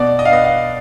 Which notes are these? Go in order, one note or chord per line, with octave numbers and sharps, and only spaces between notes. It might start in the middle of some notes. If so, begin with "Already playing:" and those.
Already playing: B2 D5
D#5
F5
B3 D#5
F5